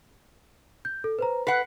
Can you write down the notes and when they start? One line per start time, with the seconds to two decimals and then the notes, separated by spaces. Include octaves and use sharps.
0.85 G6
1.04 A4
1.19 B4 C5 A#5
1.47 B4 F#5 B6 C7